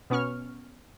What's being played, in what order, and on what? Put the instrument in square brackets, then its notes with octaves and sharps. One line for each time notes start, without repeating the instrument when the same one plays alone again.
[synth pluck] B2 B3 C#4 C#6 F6